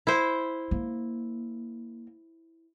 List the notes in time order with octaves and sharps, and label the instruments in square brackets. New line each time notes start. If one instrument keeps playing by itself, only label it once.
[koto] E4 C5
[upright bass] A#3